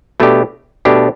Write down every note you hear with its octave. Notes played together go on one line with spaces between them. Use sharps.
B2 A3 D4 G4
B2 A3 D4 G4